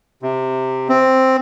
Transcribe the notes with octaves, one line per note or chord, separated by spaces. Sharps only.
C3
C4